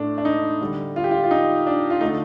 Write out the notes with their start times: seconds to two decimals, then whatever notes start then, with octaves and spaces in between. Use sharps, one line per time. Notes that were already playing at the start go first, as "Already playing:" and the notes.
Already playing: A2 A3 D4
0.18 D4
0.25 D#4
0.61 D3 G3
0.96 F4
1.04 G4
1.11 F4
1.24 F4
1.31 D#4
1.67 D4
1.90 F4
2.01 D3 A3 D#4